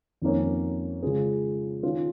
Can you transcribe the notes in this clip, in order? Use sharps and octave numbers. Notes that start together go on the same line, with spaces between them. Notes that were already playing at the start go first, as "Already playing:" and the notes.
F2 D#3 A#3 C#4
C#3 G#3 C#4 F4 G#4
D#3 C#4 F4